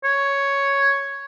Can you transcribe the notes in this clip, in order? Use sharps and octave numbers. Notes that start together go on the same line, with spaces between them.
C#5